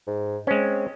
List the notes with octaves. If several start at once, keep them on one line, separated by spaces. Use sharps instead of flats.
G#2
G#3 C4 C#4